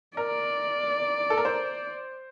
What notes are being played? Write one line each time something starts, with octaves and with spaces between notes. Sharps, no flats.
A#4 D5
A4
A#4
C5